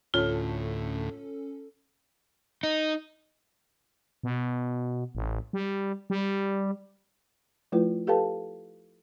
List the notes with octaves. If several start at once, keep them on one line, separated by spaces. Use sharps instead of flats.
D2 A2 C#4 F4 A4
D#4
B2
A1
G3
G3
F3 A3 E4 F4 B4
G4 A4 B4 F5 G5 A5